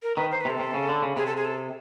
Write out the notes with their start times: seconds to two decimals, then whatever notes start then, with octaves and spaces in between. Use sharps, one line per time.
0.03 A#4
0.16 D#3 B4
0.32 C5
0.41 B4
0.45 C3 A4
0.59 C3
0.74 C#3
0.89 D3
1.03 C#3
1.17 C3 G#4
1.26 A4
1.37 G#4
1.45 A4